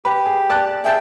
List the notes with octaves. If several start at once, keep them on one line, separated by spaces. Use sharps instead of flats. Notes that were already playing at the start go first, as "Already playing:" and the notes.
G4 B4
G#4
D5 A5 F#6
G#4 E5 G5 A5